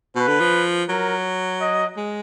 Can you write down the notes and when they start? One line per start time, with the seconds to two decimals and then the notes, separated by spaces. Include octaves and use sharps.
0.16 B2 B4
0.28 D3
0.40 F3
0.89 F#3 A#4
1.61 D#5
1.97 G#3